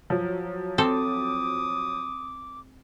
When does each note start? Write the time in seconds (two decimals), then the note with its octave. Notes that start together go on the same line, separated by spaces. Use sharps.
0.10 F3 F#3
0.78 C4 A4 D6 D#6